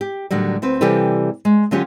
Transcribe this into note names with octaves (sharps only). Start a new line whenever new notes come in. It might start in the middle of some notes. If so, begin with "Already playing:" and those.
G4
A2 D3 D#3 F#3 G3
D2 C4 B4
C3 E3 G3 G4 A4 B4
G#3
D3 F#3 C#4 F4 G4 C#5